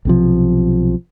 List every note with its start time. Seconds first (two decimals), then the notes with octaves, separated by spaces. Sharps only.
0.05 B1 C3 F3